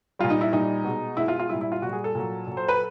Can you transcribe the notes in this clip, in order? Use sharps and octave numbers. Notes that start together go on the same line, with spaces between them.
A#2 G3 F4
D#4
E4
A#2 G3 D#4
B2 G#3
B2 G#3 E4
F4
F4
A#2 G3 E4
E4
F4
A#2 G3 F#4
G#4
A4
A#2 F#3
A#2 F#3
C5
B4